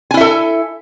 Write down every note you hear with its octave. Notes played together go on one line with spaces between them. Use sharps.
E4 A4 E5 G#5